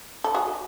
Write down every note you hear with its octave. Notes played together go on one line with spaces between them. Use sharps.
A4
F#4 G#4